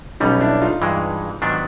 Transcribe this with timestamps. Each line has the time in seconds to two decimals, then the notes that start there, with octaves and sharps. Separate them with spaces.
0.20 B1 B2 G3 C#4 D#4
0.40 D4 E4
0.61 D#4 F4
0.82 G2 E3 G#3
1.42 G#2 D#3 F#3 B3 D4